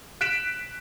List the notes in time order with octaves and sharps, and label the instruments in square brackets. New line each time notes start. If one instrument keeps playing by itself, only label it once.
[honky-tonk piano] F#6 B6 D7 E7